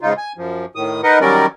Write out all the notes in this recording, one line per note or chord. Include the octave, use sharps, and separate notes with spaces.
G#2 C#3 D#4 F4
G#5
F#2 F3
A2 D#3 D#6
D#4 A#4 B4 D#5 F#5
D#3 F#3 G3 C#4 A#4 D5